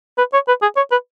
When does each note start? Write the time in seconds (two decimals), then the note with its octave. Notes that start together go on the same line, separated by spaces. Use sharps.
0.18 B4
0.33 C#5
0.48 B4
0.62 G#4
0.77 C#5
0.92 B4